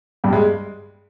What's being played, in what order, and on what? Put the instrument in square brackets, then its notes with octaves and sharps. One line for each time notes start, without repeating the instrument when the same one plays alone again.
[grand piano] G2 G3
G#3